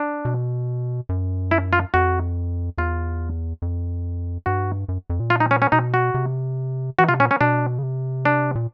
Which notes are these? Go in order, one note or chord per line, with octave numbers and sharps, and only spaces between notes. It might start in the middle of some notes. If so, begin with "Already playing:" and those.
Already playing: D4
B2
F#2
E4
F4
F2 F#4
E2 F4
F2
G2 F#4
F#2
F2
A#2
F4
D#4
C#4
C#4
B2 D#4
F#4
C3
E3 F#4
C3 F4
A#2 C#4
C#4
B2 D4
C#3
C3
D4
A#2